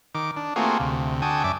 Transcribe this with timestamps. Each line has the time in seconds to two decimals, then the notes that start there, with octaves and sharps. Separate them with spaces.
0.15 D#3 D6
0.37 D4
0.56 A3 A#3 C4 F4 F#4 G#4
0.80 D2 C3
1.22 D3 F#4 A4 G5 G#5 D#6
1.44 F#2 D5 E5 D6